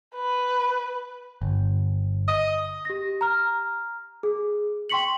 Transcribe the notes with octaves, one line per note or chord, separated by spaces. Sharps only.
B4
G1
D#5
G4 A#6
A#5 F6
G#4
G5 C6 C#6 B6 C#7 F#7